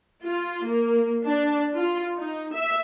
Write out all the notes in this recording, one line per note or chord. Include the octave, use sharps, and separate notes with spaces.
F4
A#3
D4
F4
D#4
E5